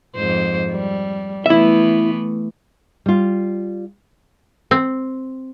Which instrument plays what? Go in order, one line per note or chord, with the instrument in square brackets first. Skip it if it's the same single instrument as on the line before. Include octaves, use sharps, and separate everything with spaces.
[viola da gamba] F2 G#2 C5
G3
[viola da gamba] E3 A3 B3 [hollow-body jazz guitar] E4 E5
[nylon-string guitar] G3 F4
[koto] C4